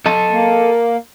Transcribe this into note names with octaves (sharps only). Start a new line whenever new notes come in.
A4 D#5 A5
A#3